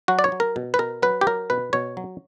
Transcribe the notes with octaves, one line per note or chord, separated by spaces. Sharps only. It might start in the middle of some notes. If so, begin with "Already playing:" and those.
F#3 F#4
D5
C#5
F#3
A#4
B2
B4
B2 A#4
F#3 B4
G4
F#3 A#4
B2 B4
B2 C#5
F#3